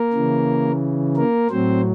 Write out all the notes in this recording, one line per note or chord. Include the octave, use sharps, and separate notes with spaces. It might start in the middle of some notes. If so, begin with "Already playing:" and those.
Already playing: A#3 A#4
C#3 E3
A#3 A#4
A2 F#3 C4 C5